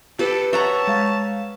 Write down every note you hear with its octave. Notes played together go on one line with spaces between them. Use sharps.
G4 A4 B4
C#5 E5 F#5 A5 A#5
G#3 F5